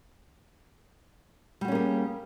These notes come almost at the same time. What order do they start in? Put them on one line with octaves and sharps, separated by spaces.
G3 F#4 C#4 A#3 G#4